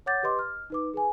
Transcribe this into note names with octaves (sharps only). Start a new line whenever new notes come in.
C#5 F#5 D6 G6 A6
G4 B4 D#5 C6 D6
F6
D#4 B4 D6
G#4 B4 G#5